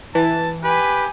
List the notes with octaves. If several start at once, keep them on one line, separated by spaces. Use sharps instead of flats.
E3 A5
G4 B4 G#5